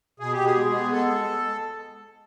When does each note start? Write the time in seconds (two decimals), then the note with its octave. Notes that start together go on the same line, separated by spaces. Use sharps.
0.20 B2 G#4
0.32 G4
0.38 B2
0.46 G#4
0.56 G#3
0.73 B3
0.92 G#3 A4
1.10 G#3